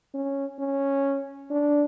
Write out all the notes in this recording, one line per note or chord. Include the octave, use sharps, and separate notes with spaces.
C#4
C#4
D4